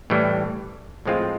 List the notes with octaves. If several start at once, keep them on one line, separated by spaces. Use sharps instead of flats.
A2 E3 G3
A2 F3 G#3 C4 F4